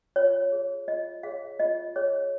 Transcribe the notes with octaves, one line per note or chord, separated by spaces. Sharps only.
F4 C#5
G#4 C#5
F4 D#5
G#4 C#5 F5
F4 D#5
G#4 C#5